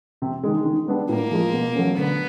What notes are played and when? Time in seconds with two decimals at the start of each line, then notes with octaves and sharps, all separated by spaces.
0.22 C3
0.43 D#3 G#3
0.65 D#3
0.88 G3 B3 D4
1.09 A2 A#3
1.31 F3 G#3
1.54 B2
1.75 F#3 A3 C#4
1.98 D3 B3